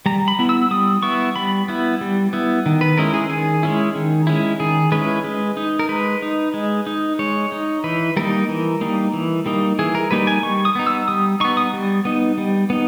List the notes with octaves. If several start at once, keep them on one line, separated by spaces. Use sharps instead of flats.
G3 A#5
B5
B3 E4
E6
G3 D#6
B3 E4 C#6
G3 B5
B3 E4
G3
B3 E4
D#3
B4
G#3 C#4 E4 A#4
G#4
D#3 G#4
G#3 C#4 E4
D#3
G#3 C#4 E4
D#3 G#4
G#3 C#4 E4 B4
G#3
D#4
A#4
G#3 B4
D#4
G#3
D#4
G#3 C#5
D#4
E3 B4
G3 A#3 D#4 A#4
E3
G3 A#3 D#4
E3
G3 A#3 D#4
E3 G#4
A#4
G3 A#3 D#4 B4
G#5
G3 C#6
D#6
B3 D#4
E6
G3 D#6
B3 D#4 C#6
D#6
G3
B3 D#4
G3
B3 D#4